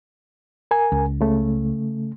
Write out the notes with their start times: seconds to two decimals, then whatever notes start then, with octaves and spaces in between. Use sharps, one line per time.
0.71 A#4 G#5
0.92 C#2
1.21 C#3 A3